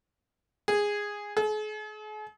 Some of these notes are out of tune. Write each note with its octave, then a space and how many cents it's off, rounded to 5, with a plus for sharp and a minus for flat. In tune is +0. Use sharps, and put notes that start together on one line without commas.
G#4 -10
G#4 +45